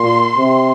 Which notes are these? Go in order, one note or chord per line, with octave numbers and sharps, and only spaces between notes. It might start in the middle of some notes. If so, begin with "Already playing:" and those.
Already playing: A#2 C6
C3